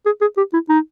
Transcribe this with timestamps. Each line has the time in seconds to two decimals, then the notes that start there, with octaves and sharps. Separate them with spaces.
0.06 G#4
0.21 G#4
0.37 G4
0.53 E4
0.69 D#4